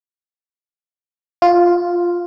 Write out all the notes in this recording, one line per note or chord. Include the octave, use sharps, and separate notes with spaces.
F4